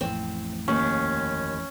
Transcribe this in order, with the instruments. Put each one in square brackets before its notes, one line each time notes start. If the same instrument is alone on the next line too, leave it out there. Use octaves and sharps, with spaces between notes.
[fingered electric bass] A1 F2 A2 [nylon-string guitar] C4
[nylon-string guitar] D#2 [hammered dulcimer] C#4